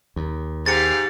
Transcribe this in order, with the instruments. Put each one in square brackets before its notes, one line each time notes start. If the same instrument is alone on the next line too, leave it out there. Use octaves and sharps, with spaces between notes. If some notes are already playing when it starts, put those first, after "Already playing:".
[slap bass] D#2
[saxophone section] G#2 [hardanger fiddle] G4 F5 [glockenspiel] A6 C#7